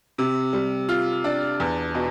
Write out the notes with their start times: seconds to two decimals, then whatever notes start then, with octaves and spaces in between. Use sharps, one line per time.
0.18 C3
0.53 G3
0.89 F4
1.24 D4
1.60 E2
1.95 B2